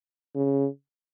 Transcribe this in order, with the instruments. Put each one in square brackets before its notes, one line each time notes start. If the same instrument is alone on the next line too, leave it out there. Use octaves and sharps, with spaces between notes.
[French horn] C#3